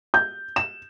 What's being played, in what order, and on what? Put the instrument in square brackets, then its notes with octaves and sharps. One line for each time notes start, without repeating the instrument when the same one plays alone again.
[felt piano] G6
E7